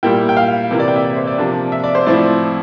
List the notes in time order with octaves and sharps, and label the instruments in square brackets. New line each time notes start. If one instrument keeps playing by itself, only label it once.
[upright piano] A#2 G3 A#3 E4 G5
G5
F5
C3 E3 A#3 E4
D5
G5
E5
D5
C5
D5
C3 F3 A#3 D4
E5
D5
C5
A2 F3 C4 E4 D5